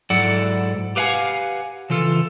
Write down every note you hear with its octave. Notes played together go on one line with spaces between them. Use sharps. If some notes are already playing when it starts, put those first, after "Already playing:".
G#2 F#3 E4 A4 D5 F#5
G4 B4 F5 F#5 G#5
C#3 E3 F4 A4